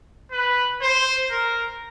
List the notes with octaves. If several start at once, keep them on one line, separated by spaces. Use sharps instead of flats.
B4
C5
A#4